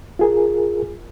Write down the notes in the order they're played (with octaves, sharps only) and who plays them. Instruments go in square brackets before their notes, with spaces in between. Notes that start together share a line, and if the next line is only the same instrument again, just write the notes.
[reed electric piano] F4 G#4 A#4